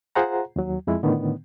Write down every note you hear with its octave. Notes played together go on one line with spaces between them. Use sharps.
F4 G#4 C5 F#5 A#5
D#2 F#3
F2 G#3 E4
A2 D3 D#3 B3